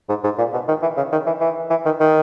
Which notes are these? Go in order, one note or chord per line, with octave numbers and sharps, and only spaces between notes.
G#2
G#2
A#2
B2
D#3
E3
C#3
D#3
E3
E3
E3
D#3
D#3